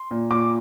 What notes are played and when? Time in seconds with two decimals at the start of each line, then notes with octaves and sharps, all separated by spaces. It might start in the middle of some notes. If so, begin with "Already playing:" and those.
Already playing: C6
0.11 A#2
0.31 A#2 D6